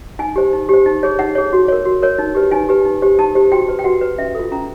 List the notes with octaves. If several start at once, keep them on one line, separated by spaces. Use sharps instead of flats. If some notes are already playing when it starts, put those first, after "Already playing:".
D#4 G#5
G4 C5
D#4
G4 C5
D#4
G#4 C#5
D#4 F#5
G#4 C#5
F#4
A#4 C#5
F#4
A#4 C#5
D#4
G4 B4
D#4 G#5
G4 B4
D#4
G4 C5
D#4 A5
G4 C5
F#4 G5
B4
G5
F#4 F#5
B4
C#4 E5
F4 A4
C#4 A#5